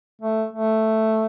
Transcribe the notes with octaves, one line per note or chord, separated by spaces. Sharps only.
A3
A3